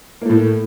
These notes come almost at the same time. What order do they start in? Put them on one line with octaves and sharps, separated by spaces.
A#3 A3 A2